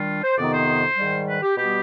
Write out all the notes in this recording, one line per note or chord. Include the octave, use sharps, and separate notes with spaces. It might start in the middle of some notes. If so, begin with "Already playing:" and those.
Already playing: D#3 G3 D4 F4
C5
F2 C3 D#3 B3 D#4 D5
C5
G#2 D#3 G3
B4
G4
B2 G3 B3 G4